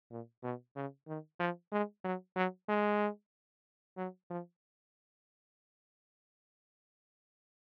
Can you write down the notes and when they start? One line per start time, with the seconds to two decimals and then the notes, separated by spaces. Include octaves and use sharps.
0.11 A#2
0.43 B2
0.76 C#3
1.08 D#3
1.40 F3
1.72 G#3
2.04 F#3
2.36 F#3
2.69 G#3
3.97 F#3
4.30 F3